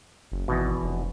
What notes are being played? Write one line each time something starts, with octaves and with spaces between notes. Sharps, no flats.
F#1
G#1 E2 B2
F1